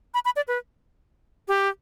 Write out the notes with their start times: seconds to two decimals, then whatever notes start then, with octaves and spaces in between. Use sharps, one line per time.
0.14 B5
0.25 B5
0.36 D5
0.48 B4
1.48 G4